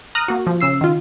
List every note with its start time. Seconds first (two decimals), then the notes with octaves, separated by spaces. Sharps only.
0.15 A#5 D#6 F6 F#6
0.28 A#3 F#4
0.47 F3
0.61 C#3 E6 C7
0.81 D#3 F4